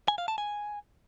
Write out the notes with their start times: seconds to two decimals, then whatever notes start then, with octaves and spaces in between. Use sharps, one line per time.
0.08 G#5
0.18 F5
0.28 A5
0.38 G#5